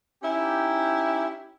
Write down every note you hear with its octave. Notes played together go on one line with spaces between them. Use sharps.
C#4 D#4 E4 G4